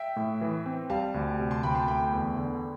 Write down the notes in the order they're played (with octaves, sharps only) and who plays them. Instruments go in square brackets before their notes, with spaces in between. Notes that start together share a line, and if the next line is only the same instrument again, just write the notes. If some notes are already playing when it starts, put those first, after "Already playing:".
Already playing: [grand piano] E5 G5
[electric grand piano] A2
E3
C4
[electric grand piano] G3 [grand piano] F5 A5
[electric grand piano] D2
C3
[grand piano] A5 C6
[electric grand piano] D2 [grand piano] G5 B5
[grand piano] A5 C6
[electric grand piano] A3 [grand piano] G5 B5
[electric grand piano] E2
D3